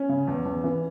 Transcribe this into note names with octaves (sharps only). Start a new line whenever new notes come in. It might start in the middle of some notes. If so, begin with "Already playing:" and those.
Already playing: C#4
C#3
E2
E2
E3